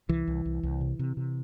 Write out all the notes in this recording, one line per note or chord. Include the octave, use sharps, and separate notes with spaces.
C2 E3
C2
C2
C2
C3
C3
C3